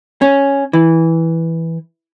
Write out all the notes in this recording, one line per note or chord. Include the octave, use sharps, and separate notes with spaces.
C#4
E3